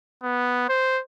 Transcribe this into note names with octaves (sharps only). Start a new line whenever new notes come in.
B3
C5